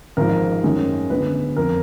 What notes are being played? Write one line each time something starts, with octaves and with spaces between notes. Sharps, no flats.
G#1 G#2 F3 A#4
F#2 D#3 G#3
D2 D3 G#3 B3 B4
F2 F3 A#4